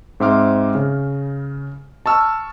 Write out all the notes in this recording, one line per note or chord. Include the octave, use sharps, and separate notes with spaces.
G#2 C4 E5 C6 D6 F6
C#3
A5 C#6 E6 F6